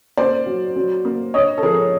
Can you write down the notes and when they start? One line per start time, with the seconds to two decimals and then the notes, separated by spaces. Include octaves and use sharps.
0.17 A#3 C5 D5
0.46 F#3
0.76 F#3
1.05 A#3
1.34 D4 C#5 D#5
1.58 A4
1.63 F3 G#4 A#4